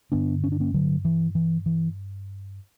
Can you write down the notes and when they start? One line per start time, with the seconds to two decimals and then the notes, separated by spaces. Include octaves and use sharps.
0.12 G2 D3 B3 D4
0.44 C#4
0.52 D4
0.60 A#3 C#4
0.74 D3 F#3
1.05 E3
1.35 E3
1.66 E3